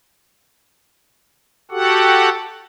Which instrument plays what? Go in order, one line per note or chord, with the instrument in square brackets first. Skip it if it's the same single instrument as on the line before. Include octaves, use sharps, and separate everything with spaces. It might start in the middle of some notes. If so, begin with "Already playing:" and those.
[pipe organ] F#4 G4 A4 F#5